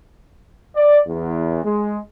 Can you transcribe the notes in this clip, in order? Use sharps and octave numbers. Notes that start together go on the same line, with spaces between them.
D5
E2
G#3